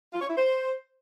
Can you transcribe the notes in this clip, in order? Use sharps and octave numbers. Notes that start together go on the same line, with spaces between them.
F4
C#5
E4
C5